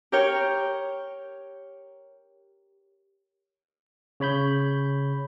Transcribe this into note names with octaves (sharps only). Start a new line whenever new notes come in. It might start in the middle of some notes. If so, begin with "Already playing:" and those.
G4 A#4 C#5 G5
C#3 C#5 B5 G6